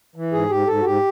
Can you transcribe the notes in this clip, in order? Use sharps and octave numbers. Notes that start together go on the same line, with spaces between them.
E3
G#2 G#4
G#2 G4
G#2 A4
F#4
G#2 G4